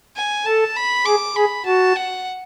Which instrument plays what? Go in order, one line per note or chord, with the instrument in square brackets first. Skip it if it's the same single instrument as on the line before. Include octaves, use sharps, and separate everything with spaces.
[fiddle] G#5
[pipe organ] A4 [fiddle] A5
[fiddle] B5
[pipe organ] G#4 [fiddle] D6
[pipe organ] G#4 [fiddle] B5
[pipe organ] F#4 [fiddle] A5
[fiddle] F#5